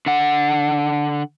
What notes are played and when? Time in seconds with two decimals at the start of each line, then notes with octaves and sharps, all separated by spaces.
0.06 D3 F#5